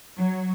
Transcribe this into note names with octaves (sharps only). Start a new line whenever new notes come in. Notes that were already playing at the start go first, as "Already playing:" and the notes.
F#3